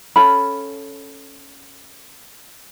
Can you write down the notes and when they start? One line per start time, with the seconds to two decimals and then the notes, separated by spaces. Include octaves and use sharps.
0.16 C#4 A4 F5 B5